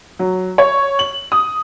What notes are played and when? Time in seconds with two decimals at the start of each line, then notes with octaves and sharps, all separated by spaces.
0.19 F#3
0.58 C#5
0.99 F#7
1.32 D#6